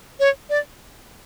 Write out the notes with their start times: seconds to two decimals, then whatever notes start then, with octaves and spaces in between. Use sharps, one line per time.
0.20 C#5
0.50 D5